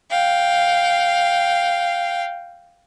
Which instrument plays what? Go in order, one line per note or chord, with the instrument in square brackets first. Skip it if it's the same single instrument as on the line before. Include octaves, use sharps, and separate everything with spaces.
[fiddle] F5 G5